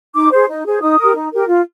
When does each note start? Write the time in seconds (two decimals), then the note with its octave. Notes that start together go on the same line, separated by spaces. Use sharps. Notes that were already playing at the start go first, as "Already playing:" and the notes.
0.15 D#4 D6
0.31 G#4 C5
0.48 D#4
0.65 G#4 C5
0.81 D#4 D#6
0.99 G4 A#4
1.15 D#4
1.32 G4 A#4
1.48 F4